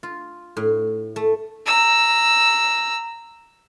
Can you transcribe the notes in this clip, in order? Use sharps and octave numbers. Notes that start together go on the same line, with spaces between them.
F4
A2
A3
A#5 E6